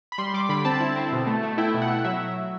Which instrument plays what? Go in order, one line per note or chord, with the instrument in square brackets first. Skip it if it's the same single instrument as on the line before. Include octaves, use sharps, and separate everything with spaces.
[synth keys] B5
G3 C6
G3 D6
D3 B5
C4 A5
E4
C4
B2
A3
A3
E4 G5
B2
F#5
A3
F#3 E5